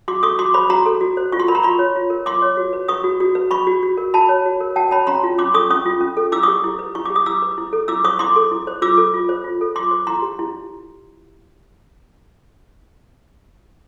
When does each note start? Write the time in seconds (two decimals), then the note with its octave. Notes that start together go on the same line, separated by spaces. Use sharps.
0.08 F#4 C6 D6
0.23 A4 C#6 D#6
0.39 F#4 C6 D6
0.54 C5 B5 C#6
0.70 F#4 A#5 C6
0.86 A4
1.01 F#4
1.17 C5
1.32 F4 C#6
1.40 C6
1.48 A#4 B5
1.55 A#5 C6
1.63 F4 B5 C#6
1.79 C#5
1.96 F4
2.10 A#4
2.26 F4 C6 D6
2.42 C#5
2.57 F#4
2.73 B4
2.88 B4 C#6 D#6
3.04 F#4
3.20 F#4
3.35 B4
3.51 B4 B5 C#6
3.67 F#4
3.83 F#4
3.97 A#4
4.14 F#4 A5 B5
4.29 C#5
4.46 F#4
4.60 A#4
4.76 F#4 G5 A5
4.91 C#5 A5 B5
5.07 C#4 A#5 C6
5.24 F4
5.39 C#4 C6 D6
5.54 A4 C#6 D#6
5.70 C#4 C#6 D#6
5.86 F4
6.01 C#4
6.17 A4
6.32 E4 D6 E6
6.43 C#6 D#6
6.48 G4
6.64 E4
6.79 B4
6.95 E4 C#6
7.05 G4 D6
7.16 D#6
7.26 E4 D6 E6
7.42 B4
7.58 E4
7.73 A4
7.88 E4 D6 E6
8.04 C5 C#6 D#6
8.19 E4 C6 D6
8.36 A4
8.51 E4
8.67 C5
8.82 F4 D6 E6
8.98 A4
9.13 F4
9.29 C5
9.44 F4
9.61 A4
9.76 F4 C6 D6
9.91 C5
10.07 E4 A#5 C6
10.22 G4
10.39 E4